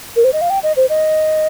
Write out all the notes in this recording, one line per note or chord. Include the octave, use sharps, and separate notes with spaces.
A#4
C5
D#5
F5
G5
D#5
C5
D#5